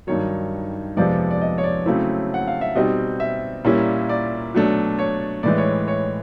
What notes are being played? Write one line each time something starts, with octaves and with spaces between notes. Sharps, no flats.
G2 D#3 F#3 C#5
F2 C3 F3 G#3 B3 D5
D5
D#5
C#5
D5
C#3 F#3 A3 C4 E4
F#5
F5
E5
B2 G3 C4 D#4 D#5
E5
A#2 G3 A#3 C#4 E4
D5
B2 F#3 A3 D4
C#5
A2 E3 G#3 D5
C#5
C#5